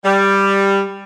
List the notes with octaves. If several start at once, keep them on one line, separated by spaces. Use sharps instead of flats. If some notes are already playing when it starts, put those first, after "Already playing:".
G3